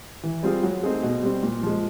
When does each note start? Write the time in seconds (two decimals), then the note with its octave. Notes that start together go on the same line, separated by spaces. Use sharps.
0.23 E3
0.43 G3 C4 F4 G#4
0.63 F#3
0.83 A3 C4 D#4 G#4
1.03 B2
1.23 G3 C4
1.43 A#2
1.63 F3 G#3